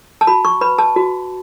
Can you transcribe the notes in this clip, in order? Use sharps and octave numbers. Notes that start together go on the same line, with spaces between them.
A5
F#4 B5
C#6
B4 B5
A5
F#4